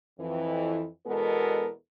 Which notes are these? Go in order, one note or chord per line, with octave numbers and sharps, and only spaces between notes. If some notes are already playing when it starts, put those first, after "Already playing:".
F2 E3
E2 B2 G#3 B3 A4 A#4